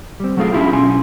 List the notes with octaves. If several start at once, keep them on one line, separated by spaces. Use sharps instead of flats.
G3 C4
F#3 A3 C#4 F4 G#4 F5
C#4 D4 E4 F4 G4
B1 C#4 G#5 C6